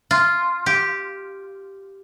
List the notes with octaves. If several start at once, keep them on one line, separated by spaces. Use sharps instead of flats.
F4
G4